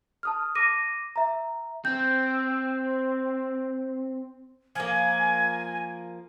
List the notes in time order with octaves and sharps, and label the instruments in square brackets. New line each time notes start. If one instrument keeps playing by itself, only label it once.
[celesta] A5 D#6 F6
D6 A#6 D#7
E5 A#5
[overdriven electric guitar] C4 [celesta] G6
[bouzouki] F3 A#3 [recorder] G#5